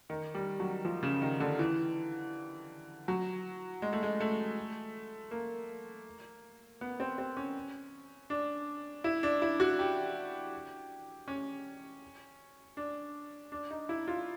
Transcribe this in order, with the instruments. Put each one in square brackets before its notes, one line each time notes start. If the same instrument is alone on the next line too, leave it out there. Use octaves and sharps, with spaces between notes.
[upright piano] D#3
G3
F#3
F3
C#3
D#3
D3
E3
F#3
G#3
A3
G#3
A3
A#3
B3
C4
C4
C#4
D4
E4
D4
E4
F#4
G4
C#4
D4
D4
D#4
E4
F4